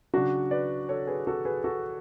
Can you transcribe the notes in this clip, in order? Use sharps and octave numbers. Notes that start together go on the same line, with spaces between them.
C#3 F#3 D4 F#4
B4 D5
A4 C#5
G#4 B4
F#4 A4
G#4 B4
F#4 A4